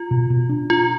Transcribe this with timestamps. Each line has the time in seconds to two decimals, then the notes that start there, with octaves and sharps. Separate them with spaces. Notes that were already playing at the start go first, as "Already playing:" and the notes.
Already playing: F4
0.11 B2
0.30 B2
0.49 D4
0.70 D4 F4